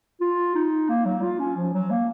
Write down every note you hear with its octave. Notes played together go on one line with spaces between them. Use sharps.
F4
D#4
A#3
F#3
F4
C#4
F3
F#3
A#3